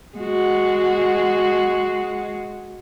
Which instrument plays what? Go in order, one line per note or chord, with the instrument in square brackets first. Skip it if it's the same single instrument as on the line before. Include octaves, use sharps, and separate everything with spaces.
[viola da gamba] G#3 F#4